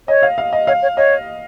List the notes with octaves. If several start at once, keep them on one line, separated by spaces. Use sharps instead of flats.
C#5 D#5
F5
F5
D#5
C#5 F5
C#5
C#5 D#5